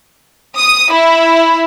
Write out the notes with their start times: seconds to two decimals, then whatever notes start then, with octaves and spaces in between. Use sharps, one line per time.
0.57 D#6
0.92 E4